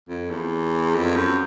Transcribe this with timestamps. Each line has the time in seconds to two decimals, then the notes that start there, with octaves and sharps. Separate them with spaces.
0.09 F2
0.30 E2
0.95 F2
1.16 F#2